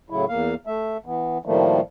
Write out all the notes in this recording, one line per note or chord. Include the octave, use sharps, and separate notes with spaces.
A2 C#3 F#3 E4
E2 A#3 F5
A3 E5
E3 B3
A2 D#3 F3 G3 A3 A#3